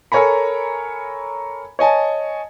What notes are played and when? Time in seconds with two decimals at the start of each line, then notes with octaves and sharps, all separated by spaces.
0.12 A4 A#4 C#5 G#5 A#5 B5
1.79 C#5 D#5 G#5 A5